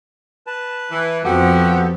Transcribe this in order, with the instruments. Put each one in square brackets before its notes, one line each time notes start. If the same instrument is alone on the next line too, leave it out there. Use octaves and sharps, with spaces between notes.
[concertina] B4 A5
[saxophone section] E3
[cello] F2 F3 [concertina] B3 A4 [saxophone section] F#4 G4